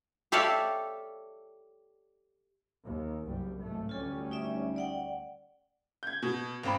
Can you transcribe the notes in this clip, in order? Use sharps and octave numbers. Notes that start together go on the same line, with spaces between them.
G4 A4 C#5 D5 E5 F5
D#2
F#1 C2 G3
G#1 A2 A3
D2 G3 C#4 F4 A4
D#4 D5 E5
D5 F#5 G5
G6 G#6
B2
G#1 C4 B5